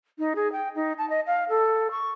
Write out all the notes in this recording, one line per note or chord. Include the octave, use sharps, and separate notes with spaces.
D#4
G#4
G5
D#4
A5
D#5
F5
A4
C#6